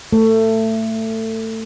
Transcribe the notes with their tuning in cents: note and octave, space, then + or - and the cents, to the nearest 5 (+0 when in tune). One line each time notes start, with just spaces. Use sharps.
A3 +20